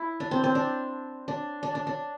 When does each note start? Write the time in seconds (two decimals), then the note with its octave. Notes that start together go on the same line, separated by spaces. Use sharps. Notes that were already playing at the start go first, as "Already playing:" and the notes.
Already playing: E4
0.20 D4
0.31 C4
0.44 C4
0.55 D4
1.28 D4
1.63 D4
1.75 D4
1.87 D4